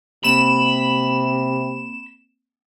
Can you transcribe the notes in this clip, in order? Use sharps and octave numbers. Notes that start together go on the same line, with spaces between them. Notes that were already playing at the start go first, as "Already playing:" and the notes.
C3 A#3 C4 B5 E7